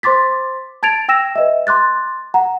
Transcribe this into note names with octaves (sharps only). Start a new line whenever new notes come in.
C5 C6 D6 A6 B6
A5 G#6 A6 D7 F7
G5 E6 A#6 E7
B4 D#5 E5
C6 D6 F#6 A6
F#5 A#5